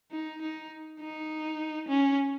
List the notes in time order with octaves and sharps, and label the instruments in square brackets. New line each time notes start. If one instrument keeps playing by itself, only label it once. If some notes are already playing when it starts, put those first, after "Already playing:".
[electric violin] D#4
D#4
D#4
C#4